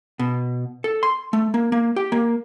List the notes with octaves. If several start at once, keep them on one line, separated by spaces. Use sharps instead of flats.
B2
A4
C6
A3
A#3
A#3
G4
A#3